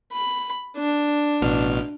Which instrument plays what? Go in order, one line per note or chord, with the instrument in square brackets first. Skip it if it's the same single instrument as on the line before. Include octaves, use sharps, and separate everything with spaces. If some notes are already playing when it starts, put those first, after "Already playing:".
[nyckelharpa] B5
D4
[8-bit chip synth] A1 B2 F6